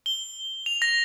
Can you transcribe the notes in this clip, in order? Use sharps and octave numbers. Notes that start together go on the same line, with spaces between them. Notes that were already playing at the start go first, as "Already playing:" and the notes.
G7
F7
A#6